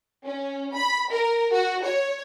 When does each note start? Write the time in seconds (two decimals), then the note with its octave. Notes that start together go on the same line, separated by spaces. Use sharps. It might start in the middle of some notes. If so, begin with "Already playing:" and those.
0.25 C#4
0.75 B5
1.11 A#4
1.52 F#4
1.83 C#5